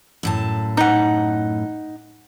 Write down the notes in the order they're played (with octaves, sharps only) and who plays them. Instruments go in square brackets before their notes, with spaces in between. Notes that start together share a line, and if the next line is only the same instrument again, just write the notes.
[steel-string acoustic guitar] F#2 A2 A5
[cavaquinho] D#4 F#5